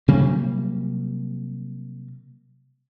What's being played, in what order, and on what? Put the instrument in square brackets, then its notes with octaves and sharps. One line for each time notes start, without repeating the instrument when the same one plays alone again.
[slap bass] C3 F#3 G3 A#3